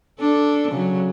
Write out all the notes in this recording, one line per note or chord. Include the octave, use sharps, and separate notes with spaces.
D4 A4
C#3 F#3